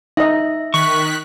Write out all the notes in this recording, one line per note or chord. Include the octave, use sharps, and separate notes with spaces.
D#4 D#5 E5
D#3 C#6 F#6 B6